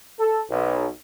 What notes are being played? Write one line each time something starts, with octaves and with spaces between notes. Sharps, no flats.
A4
B1